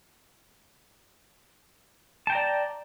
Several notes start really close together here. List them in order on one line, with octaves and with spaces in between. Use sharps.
A5 G5 A#5 D5